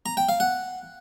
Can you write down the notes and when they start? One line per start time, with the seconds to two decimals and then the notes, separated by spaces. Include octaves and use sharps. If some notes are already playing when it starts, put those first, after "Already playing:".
0.06 A#5
0.17 G5
0.29 F5
0.40 F#5